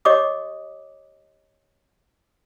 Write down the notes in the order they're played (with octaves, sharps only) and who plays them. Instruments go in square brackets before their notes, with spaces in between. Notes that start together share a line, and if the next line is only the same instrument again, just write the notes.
[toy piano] G4 C#5 D#5 D6 D#6